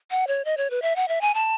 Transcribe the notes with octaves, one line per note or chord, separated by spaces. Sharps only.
F#5
C#5
D#5
C#5
B4
E5
F#5
E5
G#5
A5